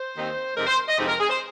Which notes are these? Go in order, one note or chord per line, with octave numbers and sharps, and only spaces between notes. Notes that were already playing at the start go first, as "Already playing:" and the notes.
Already playing: C5
D#2 D#3 C4 D#4
F2 C3 G#3 C4 D#4 A#4
C5
D#5
F2 C3 G#3 C4 D#4
A#4
G#4
C5